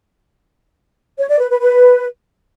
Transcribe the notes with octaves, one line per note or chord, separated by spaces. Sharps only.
C#5
D5
B4
B4
B4